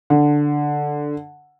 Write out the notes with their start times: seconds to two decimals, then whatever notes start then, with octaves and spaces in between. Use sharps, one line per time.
0.10 D3